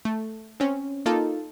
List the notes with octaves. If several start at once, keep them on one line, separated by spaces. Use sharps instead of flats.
A3
C4 C#4
A#3 D#4 F4 A4